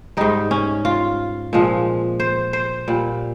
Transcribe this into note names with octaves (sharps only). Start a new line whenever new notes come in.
G#2 G3 D#4
C#4
F4
A#2 F3 G#3
C5
C5
A#2 G3